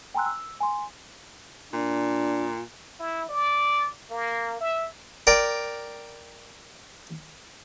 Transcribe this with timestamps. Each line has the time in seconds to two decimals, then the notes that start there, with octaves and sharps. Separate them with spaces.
0.14 G5 G#5 A#5 C6 E6 F#6
0.26 E6
0.61 G#5 C6
1.73 A#2 D4
2.99 E4
3.29 D5
4.10 A#3
4.61 E5
5.27 A#4 D5 G5